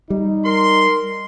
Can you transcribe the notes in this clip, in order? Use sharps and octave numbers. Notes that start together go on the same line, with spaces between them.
G3 D#4
A#4 C6